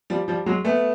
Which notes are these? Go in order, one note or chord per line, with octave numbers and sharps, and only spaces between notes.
F3 G3
F3 G3
F#3 G#3
A3 B3